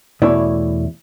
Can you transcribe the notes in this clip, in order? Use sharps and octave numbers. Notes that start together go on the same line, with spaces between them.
E2 B2 A3 E4 C#5 D5